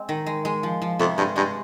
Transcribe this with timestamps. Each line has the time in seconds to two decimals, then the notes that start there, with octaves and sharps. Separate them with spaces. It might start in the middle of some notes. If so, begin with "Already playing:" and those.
Already playing: G#3 C4
0.09 D#3
0.26 G#3
0.45 G#3
0.63 F3
0.82 F3
0.99 F2 C3
1.18 G2 G#3
1.36 G2 G#3